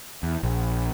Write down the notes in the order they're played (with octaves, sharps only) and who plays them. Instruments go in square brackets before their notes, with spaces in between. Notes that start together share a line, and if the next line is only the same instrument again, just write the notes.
[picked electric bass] E2
A#1